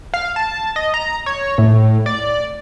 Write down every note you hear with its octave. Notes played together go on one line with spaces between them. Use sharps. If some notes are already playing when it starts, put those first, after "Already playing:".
F5
A5
D#5
A#5
C#5
A2
D5